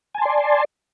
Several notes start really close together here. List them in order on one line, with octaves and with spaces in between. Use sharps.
G#5 A5 C6 D5